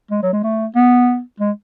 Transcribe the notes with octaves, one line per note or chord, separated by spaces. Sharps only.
G#3
F#3
G#3
A3
B3
G#3